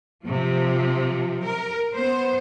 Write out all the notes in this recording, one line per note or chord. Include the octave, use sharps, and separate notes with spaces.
C3 F3
A#4
B3 C5